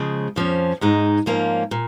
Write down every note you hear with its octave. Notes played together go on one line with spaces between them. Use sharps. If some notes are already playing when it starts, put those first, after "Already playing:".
Already playing: C#3 F3 G#3
F2 F3 C#4
G#2 G#3 D#4
G#2 F3 A#3 C#4
A#2